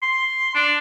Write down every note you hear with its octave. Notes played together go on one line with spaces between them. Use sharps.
C6
D4